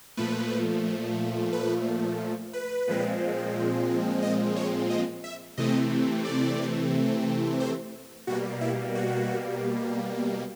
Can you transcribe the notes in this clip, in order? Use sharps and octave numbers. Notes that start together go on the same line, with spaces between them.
A#2 F3 A3 B4
B4
B4
A#2 F3 G#3 C4
D#5
C#5
D#5
E5
C3 E3 A3 C4 D#5
D5
C5
B2 G3 A#3 F#4
E4
F#4